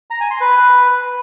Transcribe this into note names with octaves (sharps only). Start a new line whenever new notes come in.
A#5
G#5
C6
B4